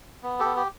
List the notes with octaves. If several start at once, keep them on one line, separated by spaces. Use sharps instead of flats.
B3
B3 G4 A4
G4